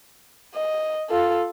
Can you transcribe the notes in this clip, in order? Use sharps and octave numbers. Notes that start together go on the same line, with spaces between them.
D#5
F4 A4